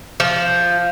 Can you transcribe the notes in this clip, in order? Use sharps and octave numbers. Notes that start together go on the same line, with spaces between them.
F3